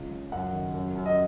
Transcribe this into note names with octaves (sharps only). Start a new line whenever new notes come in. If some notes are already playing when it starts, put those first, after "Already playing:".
Already playing: C#2
C#3
F#2 F#5
D#3
F#2
F#2
D#5